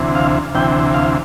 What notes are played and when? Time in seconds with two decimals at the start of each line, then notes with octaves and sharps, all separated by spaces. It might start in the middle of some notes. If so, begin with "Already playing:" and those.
Already playing: D2 C3 E3
0.15 F5
0.54 D2 C3 E3 G5
0.94 F5